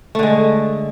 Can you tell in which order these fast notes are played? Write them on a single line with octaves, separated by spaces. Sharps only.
A3 D3 G#3